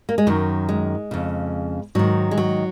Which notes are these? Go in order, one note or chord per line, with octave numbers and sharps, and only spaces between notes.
A#3
G#3
F#2 D#3 F#3
G#3
F2 C#3
G#2 D#3 F#3
G#3
F#3